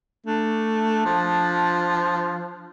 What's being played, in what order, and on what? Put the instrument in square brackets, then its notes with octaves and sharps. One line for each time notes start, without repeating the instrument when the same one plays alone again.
[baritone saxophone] A3 [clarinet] D4
[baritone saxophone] F3